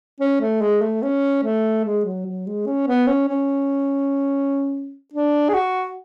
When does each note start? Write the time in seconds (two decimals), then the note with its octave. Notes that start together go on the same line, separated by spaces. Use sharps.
0.20 C#4
0.40 A3
0.61 G#3
0.81 A3
1.02 C#4
1.43 A3
1.85 G#3
2.05 F#3
2.26 F#3
2.47 G#3
2.66 C#4
2.87 B3
3.07 C#4
3.28 C#4
5.13 D4
5.49 G#4
5.54 F#4